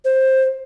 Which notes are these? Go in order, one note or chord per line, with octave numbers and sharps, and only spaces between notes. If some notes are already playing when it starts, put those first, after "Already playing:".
C5